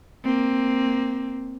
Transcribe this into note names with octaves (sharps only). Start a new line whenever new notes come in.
A#3 C4